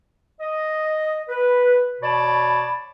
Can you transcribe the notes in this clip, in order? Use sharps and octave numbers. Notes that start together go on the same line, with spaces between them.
D#5
B4
B2 C#5 D5 A5 B5